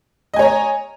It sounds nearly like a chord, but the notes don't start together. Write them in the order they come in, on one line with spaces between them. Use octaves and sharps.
D#5 G#5 C#5 A#5